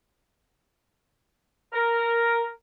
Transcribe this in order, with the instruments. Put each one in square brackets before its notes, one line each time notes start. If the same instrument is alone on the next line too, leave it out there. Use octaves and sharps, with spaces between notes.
[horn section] A#4